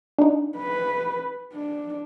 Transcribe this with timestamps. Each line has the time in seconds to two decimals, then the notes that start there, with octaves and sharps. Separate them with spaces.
0.19 D4 D#4
0.57 B4
1.54 D4